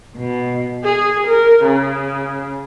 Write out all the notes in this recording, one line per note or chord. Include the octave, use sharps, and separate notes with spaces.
B2
G#4
A#4
C#3